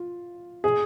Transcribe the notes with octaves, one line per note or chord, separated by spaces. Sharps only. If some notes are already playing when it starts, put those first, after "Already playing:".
Already playing: F4
G#4